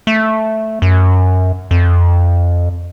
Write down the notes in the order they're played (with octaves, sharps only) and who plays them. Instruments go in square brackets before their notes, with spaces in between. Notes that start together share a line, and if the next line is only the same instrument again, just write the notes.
[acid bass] A3
F#2
F2